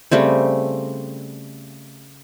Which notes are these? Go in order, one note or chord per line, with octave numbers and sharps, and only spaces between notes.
C#3 G3 A3 C4